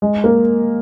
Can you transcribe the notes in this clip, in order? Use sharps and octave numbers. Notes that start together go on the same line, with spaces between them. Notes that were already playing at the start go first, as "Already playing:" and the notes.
G#3
A#3